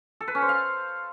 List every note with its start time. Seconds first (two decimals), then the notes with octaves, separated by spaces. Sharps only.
0.21 A4
0.28 B4
0.35 C#4
0.42 C5
0.49 F5